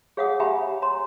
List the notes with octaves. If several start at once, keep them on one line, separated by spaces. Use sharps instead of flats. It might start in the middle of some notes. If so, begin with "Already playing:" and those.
G#4 C#5 F5 F#5 G#5 D#6
G4 E5 F#5 G#5 A#5 B5
C#5 G#5 A#5 C6